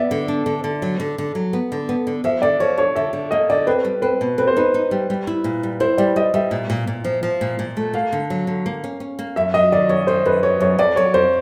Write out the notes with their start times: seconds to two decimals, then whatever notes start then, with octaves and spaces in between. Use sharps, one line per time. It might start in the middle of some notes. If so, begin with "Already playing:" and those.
Already playing: B3 D5 E5
0.11 D3
0.28 D4
0.46 D3
0.64 D3
0.82 F#3
1.00 D3
1.18 D3
1.35 F#3
1.53 B3
1.72 D3
1.89 B3
2.07 D3
2.24 F3 E5
2.42 D3 D5
2.60 F3 C#5
2.78 D4 C#5
2.96 D3 E5
3.13 D3
3.31 A#3 D#5
3.50 D3 D5
3.67 C4 B4
3.85 G3
4.02 C4 B4
4.21 B2
4.38 C4 B4
4.47 C5
4.57 D#4 B4
4.74 D#4
4.91 G3
5.10 G3
5.27 E4
5.44 A#2
5.63 G3
5.80 E4 C5
5.98 G3 D5
6.16 G3 D#5
6.34 G3 E5
6.51 A#2
6.70 A#2
6.87 A#2
7.04 F3
7.23 F3
7.41 A#2
7.59 A#2
7.77 A3
7.93 A#3 F5
8.12 D3
8.30 F#3
8.47 D3
8.66 A#3
8.84 C#4
9.00 C#4
9.19 A#3
9.36 F#2 E5
9.54 F#3 D#5
9.72 D#3 D5
9.89 F#2 C#5
10.07 D#3 C5
10.26 F#2 B4
10.43 F#3 C#5
10.60 F#2 C#5
10.79 F2 D5
10.96 F#3 C#5
11.14 F2 C5